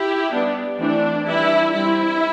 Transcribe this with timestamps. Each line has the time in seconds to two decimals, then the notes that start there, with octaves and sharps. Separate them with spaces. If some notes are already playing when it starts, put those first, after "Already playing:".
Already playing: E4 G4
0.31 G3 B3 D4
0.79 E3 A3 C4 D4
1.27 E3 G3 D4 E4
1.73 G3 C4 E4